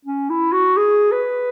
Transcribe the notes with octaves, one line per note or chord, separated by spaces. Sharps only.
C#4
E4
F#4
G#4
B4